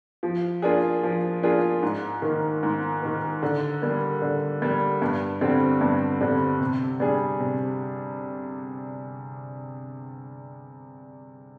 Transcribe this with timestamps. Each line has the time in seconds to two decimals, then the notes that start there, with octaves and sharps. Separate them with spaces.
0.23 F3
0.62 A#3 D4 F4 G#4
1.03 F3
1.43 A#3 D4 F4 G#4
1.82 G#2
2.22 D#3 A#3
2.63 G#2
3.02 D#3 A#3
3.42 D3
3.82 G3 A#3
4.22 D3
4.62 G3 A#3
5.02 G2
5.41 D3 G3 C4
5.81 G2
6.20 D3 G3 C4
6.60 C3
7.00 G3 D4 G#4
7.40 C3